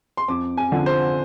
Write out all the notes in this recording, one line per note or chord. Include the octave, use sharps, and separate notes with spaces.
C6
F2 D6
G#5
D3 F3
C5